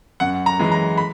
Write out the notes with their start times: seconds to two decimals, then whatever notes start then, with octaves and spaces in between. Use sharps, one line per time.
0.20 F#2 F#5
0.46 A#5
0.59 E3 G#3
0.72 A#5
0.98 B5